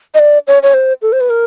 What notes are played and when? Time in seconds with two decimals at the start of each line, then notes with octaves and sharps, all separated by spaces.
0.14 D#5
0.19 D5
0.47 C#5
0.63 C#5
0.74 C5
1.02 A4
1.13 C5
1.21 B4
1.30 A#4